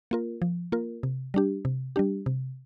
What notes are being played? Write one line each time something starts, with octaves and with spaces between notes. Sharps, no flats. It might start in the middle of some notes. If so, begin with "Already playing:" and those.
A#3 F4 A#4
F3
A#3 F4 A#4
C3
G3 D4 G4
C3
G3 D4 G4
C3